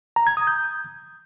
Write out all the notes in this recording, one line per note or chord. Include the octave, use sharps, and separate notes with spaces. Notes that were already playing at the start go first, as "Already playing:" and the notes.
A#5
G#6
D#6
G6